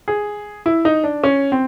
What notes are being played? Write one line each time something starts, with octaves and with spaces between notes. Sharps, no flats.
G#4
E4
D#4
D4
C#4
C4